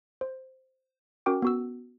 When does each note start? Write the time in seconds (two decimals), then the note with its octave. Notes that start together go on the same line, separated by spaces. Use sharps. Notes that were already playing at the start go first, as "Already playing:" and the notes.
0.21 C5
1.26 C#4 F#4 A#4 G5 D6
1.42 B3 F#4 E6